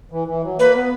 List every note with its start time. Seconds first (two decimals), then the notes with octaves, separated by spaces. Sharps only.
0.11 E3
0.28 E3
0.43 F#3
0.59 A#3 B4
0.75 B3